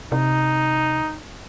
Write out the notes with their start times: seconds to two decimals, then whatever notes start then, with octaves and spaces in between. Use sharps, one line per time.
0.12 C3 D#4